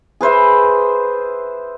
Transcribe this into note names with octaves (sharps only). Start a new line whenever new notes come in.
G#4 B4 C5 E5